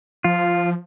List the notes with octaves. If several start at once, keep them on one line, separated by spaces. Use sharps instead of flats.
F3 F4